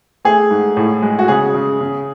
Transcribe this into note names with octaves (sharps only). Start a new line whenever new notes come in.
A3 G#4
G#2
A2
G#3
F#4
C#3 G#4
C#3
C#3